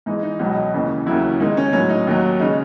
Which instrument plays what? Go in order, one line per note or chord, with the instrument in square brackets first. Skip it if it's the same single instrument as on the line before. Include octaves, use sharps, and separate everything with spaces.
[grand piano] G#2 E3 G#3 D#4
D#4
C#2 B2 F#3
D#2 C#3 E3
D#2 C#3 F#3 E4
G#2 D#3 G#3 D#4
C#4
A2 F#3 C#4
D#4
D#2 D#3 F#3
C#3 G#3 D#4